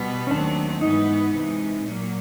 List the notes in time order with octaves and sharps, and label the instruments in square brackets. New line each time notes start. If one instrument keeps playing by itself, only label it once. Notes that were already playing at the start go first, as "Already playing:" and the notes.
Already playing: [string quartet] B2 G3 B3
[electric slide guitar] C#4
[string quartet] D#2 D#3 F#3 A3 C4 [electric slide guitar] D4
[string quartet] G#2 E3 G#3 B3 [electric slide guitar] D#4
[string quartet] C3 E3 G#3
A#2 F#3 A#3